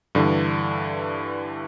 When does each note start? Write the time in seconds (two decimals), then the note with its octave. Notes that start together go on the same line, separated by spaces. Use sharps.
0.15 G2 D3 E3